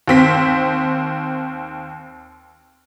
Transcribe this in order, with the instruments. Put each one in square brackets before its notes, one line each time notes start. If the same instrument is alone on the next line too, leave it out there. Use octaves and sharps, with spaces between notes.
[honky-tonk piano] D#2 C4 B6